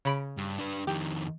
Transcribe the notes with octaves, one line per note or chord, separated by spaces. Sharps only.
C#3 B5 D7
G2
D4 B4
F2 D#3 G4